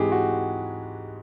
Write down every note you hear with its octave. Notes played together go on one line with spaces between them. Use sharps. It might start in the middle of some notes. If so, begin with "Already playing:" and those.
Already playing: G#2 E3 G#3 C4 G4 G#4
F#4